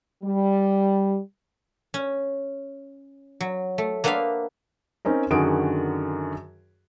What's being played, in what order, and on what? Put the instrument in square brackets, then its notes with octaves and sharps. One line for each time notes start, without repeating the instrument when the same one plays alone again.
[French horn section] G3
[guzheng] C#4
F#3
A3
A#3 B3 D4 C5 E5 F5
[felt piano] C4 C#4 D#4 A#4
F#2 D3 D#3 F#4 G#4 D7